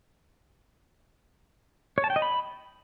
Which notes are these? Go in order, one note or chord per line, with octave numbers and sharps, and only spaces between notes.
C#5
A5
G5
D#5
B5